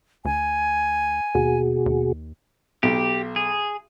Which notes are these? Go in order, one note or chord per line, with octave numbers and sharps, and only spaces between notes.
D2 G#5
D#2 B2 F#4 G#4
D#2
B1 G4
G#4